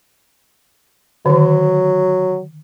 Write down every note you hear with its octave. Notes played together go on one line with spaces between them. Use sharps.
D3 D#3 F#3